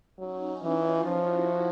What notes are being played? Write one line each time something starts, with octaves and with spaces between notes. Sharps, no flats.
F#3 C#4 D#4
E3 D#4 F4
F3 E4 F#4